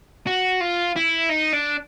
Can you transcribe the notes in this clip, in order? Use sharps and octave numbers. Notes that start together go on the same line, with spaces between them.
F#4
F4
E4
D#4
D4